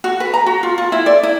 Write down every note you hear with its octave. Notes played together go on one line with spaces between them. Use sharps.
F#4
B4
A#5
F#4
F4
F4
E4
D5
E4